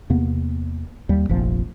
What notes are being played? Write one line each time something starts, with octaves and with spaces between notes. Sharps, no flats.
E2 C3 A#3 B3
D#2 G3 A#3
F1 A#1 F3